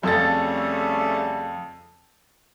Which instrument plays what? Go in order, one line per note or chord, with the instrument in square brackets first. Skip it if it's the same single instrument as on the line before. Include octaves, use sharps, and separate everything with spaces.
[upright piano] F2 A4 A6 [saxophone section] C#3 G3 A3